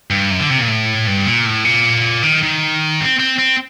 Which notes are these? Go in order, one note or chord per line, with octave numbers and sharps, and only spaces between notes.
G2
F#2
D3
C3
A#2
A2
G2
A#2
A2
A#2
D#3
D#3
C4
C4
C4